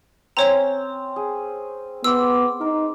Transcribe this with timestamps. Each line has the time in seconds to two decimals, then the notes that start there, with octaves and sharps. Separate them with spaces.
0.37 C4 C#4 C#5 A#5
1.16 G#4
2.04 B3 C6 D6 E6
2.61 D#4 A#4